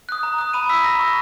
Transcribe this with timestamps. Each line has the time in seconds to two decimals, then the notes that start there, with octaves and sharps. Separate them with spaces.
0.09 D#6 F#6
0.23 A#5
0.38 D#6 F#6
0.53 B5 D#7
0.69 E6 B6
0.84 A#5 A#6
0.99 C#6 E6